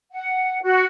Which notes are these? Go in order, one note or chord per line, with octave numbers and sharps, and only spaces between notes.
F#5
F#4